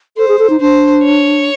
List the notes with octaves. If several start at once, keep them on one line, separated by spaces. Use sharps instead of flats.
A4 C5
G#4
A4
D#4
D4 C5
C#5